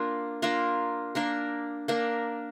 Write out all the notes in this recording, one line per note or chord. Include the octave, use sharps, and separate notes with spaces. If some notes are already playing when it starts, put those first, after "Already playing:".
Already playing: A#3 D4 F4 A#4
A#3 D4 F4 A#4
A#3 D4 A#4
A#3 D4 A#4